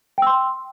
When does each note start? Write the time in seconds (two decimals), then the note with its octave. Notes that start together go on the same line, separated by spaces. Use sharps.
0.18 G5
0.22 E6
0.27 C6